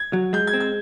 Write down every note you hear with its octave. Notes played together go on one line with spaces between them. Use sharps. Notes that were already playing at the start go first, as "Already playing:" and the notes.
Already playing: G#6
F#3
G#3 G6
G#6
C4
G#6